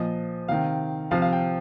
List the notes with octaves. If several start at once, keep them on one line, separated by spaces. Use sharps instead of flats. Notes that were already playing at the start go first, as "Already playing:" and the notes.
Already playing: A#2 F3 D#5
C3 D#3 F5
C3 F3 F5
F5
G5